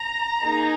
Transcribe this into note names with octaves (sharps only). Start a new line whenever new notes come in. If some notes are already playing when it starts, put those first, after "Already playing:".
Already playing: A#5
A#3 D#4 G#4